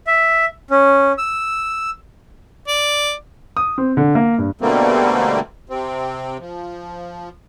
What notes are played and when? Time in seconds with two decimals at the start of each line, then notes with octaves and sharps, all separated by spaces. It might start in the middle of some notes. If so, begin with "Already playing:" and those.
0.07 E5
0.70 C#4
1.18 E6
2.68 D5
3.57 D#6
3.78 C4
3.97 D3
4.15 A#3
4.38 G2
4.61 B2 D3 G3 A3 A#3 C4
5.69 C3 C4
6.39 F3